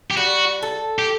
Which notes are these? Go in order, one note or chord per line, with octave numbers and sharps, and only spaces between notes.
G4
G3 F#4
A4
G4